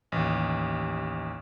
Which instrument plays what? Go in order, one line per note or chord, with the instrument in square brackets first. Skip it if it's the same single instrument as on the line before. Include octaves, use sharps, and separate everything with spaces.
[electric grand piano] A1 D#2